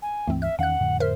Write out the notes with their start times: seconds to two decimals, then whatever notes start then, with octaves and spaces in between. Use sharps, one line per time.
0.02 G#5
0.27 C#2 G2 E3 A3 C4
0.42 E5 F6
0.59 E2 D#3 C#4 F5 F#5 F#6
0.80 F2 A2 D3
1.00 A#4 C5 E5 F6